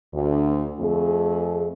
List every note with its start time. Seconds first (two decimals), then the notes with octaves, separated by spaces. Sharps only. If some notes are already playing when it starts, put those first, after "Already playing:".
0.12 D2
0.79 F2 A3 G#4